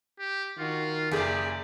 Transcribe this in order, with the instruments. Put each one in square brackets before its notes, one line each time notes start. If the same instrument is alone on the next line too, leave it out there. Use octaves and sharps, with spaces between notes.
[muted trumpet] G4
[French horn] D#3 [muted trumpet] F4 [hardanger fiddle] F#4
[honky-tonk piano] F#1 G#4 [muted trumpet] G4 [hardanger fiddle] D5